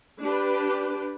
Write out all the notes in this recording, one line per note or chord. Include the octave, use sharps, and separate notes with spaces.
D4 G4 B4